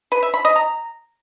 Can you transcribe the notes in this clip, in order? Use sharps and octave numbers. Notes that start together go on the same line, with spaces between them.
B4
E5
B5
D#5
A#5